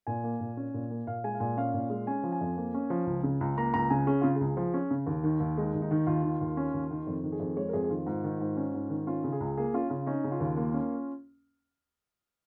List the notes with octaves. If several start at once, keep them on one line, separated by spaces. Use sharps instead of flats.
A#2 G#5
A#3
A#2
C#4
A#2
A#3
A#2 F5
G#3 G#5
F5
A#2 G#5
C#4 F5
A#2
G#3
C#4 G#5
F3
G#5
F2
A#3
C#4
F3
C#2
C#3
C#2
A#3 A#5
C#2 A#5
C#3 G#5
C#4 G#4
C#3 F4
G#4
C#2
F3
C#4
C#3
D#2
D#3
D#2
G#3 D#4
D#2
D#4
D#3
D#2 F4
D#3
D#2
C#4
D#2
D#3
F2
D#3
G#4
F2
G#3 C#5
A#4
F2 G#4
G#4
D#3 F4
G#2 F4
D#3
G#2
C#4
G#2
D#3
C#4 F4
C#3
G#4
C#2
A#3 G#4
C#4 F4
C#3 F4
C#4 D#4
C#3
F4
D#2
A#3
C#4